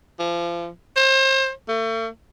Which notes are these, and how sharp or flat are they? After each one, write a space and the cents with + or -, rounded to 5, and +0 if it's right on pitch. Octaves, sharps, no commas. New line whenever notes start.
F3 -30
C5 +35
A3 +40